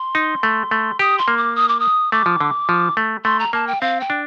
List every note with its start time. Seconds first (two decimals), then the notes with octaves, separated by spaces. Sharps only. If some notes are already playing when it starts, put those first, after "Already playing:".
Already playing: C6
0.15 D#4
0.43 A3
0.71 A3
0.99 G4 D#6
1.18 C6
1.28 A#3
1.37 D6
1.56 D#6
1.69 D6
1.80 D#6
2.12 A3 D6
2.26 F3
2.40 D3
2.69 F3
2.97 A3
3.25 A3 C6
3.39 A#5
3.53 A#3 A5
3.67 G5
3.81 C4 F5
4.00 G5
4.10 D4